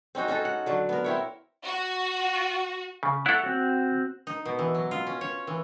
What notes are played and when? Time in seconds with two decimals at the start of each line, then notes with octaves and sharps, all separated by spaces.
0.15 C4 C#4 D#4 F#4
0.28 C#4 D#4 F#4 A4
0.45 F#5
0.66 D3 F#3
0.89 B3 A#4
1.04 C4 E4 C#5
1.65 F#4
3.03 C#3
3.26 E4 A4 C#5 F#5
3.43 C4 F#4
4.27 D#4
4.45 B2
4.59 E3
4.75 F#3
4.91 F4
5.07 C#4
5.21 C#5
5.47 E3